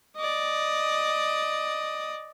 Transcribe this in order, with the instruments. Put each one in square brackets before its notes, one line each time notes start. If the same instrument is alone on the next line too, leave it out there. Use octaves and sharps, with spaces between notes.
[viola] D5 D#5